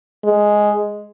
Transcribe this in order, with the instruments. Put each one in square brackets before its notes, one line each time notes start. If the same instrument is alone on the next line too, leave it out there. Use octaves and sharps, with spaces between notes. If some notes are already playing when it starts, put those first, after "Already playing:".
[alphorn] G#3